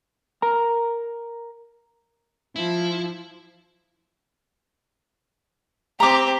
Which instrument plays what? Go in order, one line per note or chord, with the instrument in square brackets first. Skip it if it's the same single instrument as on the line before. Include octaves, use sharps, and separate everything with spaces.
[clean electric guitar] A#4 A#5
[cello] F3 [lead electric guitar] E4
[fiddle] C4 G4 [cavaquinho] A#5 D6